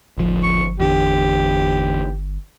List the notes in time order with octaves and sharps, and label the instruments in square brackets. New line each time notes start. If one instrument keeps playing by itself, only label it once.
[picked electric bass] D1 F3 [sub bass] G1
[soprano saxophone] C#6
[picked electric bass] E2 D3 [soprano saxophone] G4